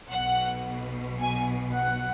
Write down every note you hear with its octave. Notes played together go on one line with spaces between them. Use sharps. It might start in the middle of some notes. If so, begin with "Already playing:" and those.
B1 B2 F#5
G#5
F#5